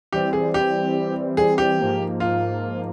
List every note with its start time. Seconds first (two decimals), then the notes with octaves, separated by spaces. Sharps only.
0.13 E3 G3 C4 G4
0.33 G#4
0.54 G4
1.37 G#4
1.58 G4
1.79 G#2 F3 A#3
2.20 F4